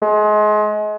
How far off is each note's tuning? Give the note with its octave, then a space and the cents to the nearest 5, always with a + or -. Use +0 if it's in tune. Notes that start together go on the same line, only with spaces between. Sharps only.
G#3 +30